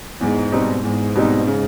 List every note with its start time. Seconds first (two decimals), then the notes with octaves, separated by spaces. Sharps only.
0.21 E2 G#2
0.52 B2 G3 C4 D#4
0.84 E2 G#2
1.15 B2 G3 C4 D#4
1.47 C#3